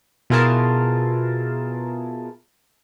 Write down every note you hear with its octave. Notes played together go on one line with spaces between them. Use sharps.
B2 E4 F4 G#4 A#4 A5